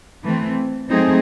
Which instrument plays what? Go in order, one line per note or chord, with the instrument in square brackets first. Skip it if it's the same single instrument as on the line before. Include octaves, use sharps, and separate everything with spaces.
[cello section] E3 A3 C4
F#3 A3 C4 D#4 G#4